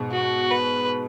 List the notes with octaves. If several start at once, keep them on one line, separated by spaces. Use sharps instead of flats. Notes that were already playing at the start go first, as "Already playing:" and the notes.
Already playing: G#2 B2
F#4
B4